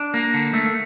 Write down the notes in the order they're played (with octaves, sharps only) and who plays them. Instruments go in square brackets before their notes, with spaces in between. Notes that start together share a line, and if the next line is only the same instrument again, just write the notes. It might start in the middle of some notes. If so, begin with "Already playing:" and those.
Already playing: [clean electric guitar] D4
A#3
D3
A3